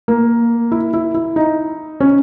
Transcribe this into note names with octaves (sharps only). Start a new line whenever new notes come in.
A#3
E4
E4
E4
D#4
C#4